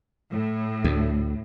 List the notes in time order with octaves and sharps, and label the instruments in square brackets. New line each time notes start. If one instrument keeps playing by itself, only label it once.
[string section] A2
[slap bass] D2